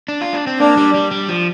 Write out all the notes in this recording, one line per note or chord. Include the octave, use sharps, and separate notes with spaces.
D4
F4
D4
C4
A#3 D4
G3
G3
G3
F3